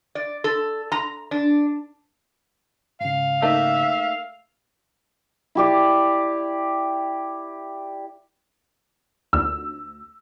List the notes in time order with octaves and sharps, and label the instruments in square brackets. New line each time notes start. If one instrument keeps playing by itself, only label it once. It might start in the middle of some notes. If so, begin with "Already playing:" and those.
[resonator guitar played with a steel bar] D5
A4
A#5
D4
[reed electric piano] G#2 C#3 [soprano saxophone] F5
[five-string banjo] A3 A#3 D#4 [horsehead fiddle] E5
[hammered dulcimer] E4 G4 D5
[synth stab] D2 [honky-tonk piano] E6